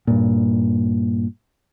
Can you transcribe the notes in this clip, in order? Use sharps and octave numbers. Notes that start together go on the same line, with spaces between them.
G2 A#2